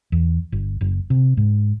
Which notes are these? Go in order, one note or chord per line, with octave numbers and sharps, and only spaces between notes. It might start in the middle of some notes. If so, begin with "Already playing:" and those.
E2
G1
F#1
C3
G#2